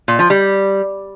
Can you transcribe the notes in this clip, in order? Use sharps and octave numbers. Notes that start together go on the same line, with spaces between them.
A#2
F3
G3